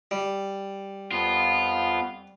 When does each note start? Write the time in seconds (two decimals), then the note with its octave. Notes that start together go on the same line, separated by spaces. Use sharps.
0.11 G3
1.11 F2 B3 F4